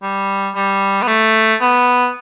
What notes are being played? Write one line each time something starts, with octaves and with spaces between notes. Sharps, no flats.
G3
G3
B3
A3
B3